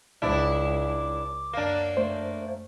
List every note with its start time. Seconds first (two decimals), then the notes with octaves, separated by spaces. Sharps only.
0.22 C#2 D4 E4 D6
1.53 F#2 A#3 D4
1.97 A3 C5